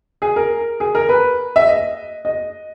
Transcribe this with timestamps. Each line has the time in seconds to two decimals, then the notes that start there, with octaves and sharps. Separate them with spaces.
0.22 G#4
0.36 A#4
0.80 G#4
0.95 A#4
1.09 B4
1.56 E5
1.67 D#5
2.25 D#5